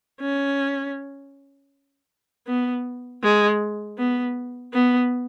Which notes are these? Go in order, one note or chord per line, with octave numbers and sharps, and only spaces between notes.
C#4
B3
G#3
B3
B3